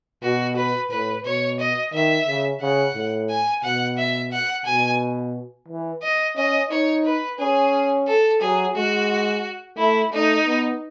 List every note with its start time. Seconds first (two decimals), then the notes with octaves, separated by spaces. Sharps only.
0.23 B2 F#4
0.56 B4
0.91 A2 B4
1.24 B2 C#5
1.60 D#5
1.93 D#3 E5
2.27 C#3
2.61 C#3 F#5
2.95 A2
3.30 G#5
3.63 B2 F#5
3.98 E5
4.32 F#5
4.66 B2 G#5
5.68 E3
6.03 D#5
6.36 C#4 D#5
6.70 D#4 C#5
7.05 B4
7.39 C#4 G#4
8.07 A4
8.41 F#3 G#4
8.75 G#3 F#4
9.77 A3 E4
10.12 A3 D#4
10.46 B3